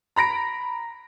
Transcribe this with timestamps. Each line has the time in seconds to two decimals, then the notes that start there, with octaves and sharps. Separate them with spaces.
0.16 A#5 B5 A#6 D7